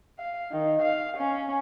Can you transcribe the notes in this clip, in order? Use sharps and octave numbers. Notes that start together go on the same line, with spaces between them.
F5
D#3
F5
C#4